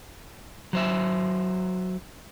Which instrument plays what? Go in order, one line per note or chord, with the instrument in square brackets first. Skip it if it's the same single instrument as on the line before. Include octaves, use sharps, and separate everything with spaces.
[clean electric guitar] F#3 C5 E5